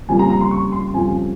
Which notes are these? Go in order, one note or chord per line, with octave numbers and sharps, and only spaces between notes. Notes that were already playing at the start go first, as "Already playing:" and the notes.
F2 C#3 G3 A#3 G#5
A#5
A#5
C6
C#6
C6
F2 C#3 G3 G#5